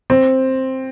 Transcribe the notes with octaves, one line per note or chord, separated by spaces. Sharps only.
C4